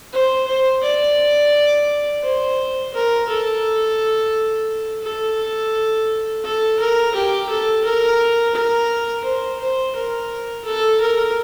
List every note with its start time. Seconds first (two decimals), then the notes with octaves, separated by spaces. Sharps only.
0.13 C5
0.47 C5
0.83 D5
2.23 C5
2.94 A#4
3.29 A4
5.03 A4
6.44 A4
6.79 A#4
7.15 G4
7.49 A4
7.84 A#4
8.55 A#4
9.24 C5
9.60 C5
9.96 A#4
10.65 A4
11.01 A#4